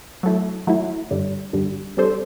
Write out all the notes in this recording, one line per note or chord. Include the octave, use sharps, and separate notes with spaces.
F#3 A3 E4
F#3 A3 E4
G2 D3 G3
G2 D3 G3
C3 G3 D4 A4 C5